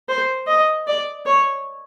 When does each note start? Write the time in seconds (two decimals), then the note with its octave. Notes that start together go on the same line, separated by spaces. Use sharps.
0.08 C5
0.47 D#5
0.87 D5
1.26 C#5